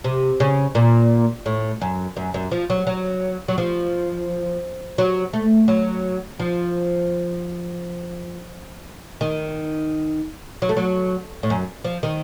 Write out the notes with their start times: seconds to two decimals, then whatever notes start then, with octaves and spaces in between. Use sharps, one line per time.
0.04 C3
0.40 C#3
0.75 A#2
1.46 A2
1.82 F#2
2.17 F#2
2.34 F#2
2.51 F3
2.70 F#3
2.87 F#3
3.48 F#3
3.58 F3
4.98 F#3
5.33 A3
5.68 F#3
6.39 F3
9.21 D#3
10.62 F#3
10.69 A3
10.77 F#3
11.43 A2
11.50 F#2
11.84 F3
12.03 D#3